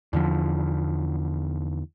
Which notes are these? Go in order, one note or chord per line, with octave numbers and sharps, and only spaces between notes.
E2 D3 F3